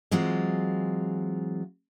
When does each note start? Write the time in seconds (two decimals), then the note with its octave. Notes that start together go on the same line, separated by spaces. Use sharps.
0.11 E3 F#3 G#3 C4 F4